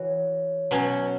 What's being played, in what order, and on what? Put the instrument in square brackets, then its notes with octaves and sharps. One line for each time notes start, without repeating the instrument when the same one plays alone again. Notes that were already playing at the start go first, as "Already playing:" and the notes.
Already playing: [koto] E3 F#4 [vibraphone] C#5
[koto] B2 F#3 C#4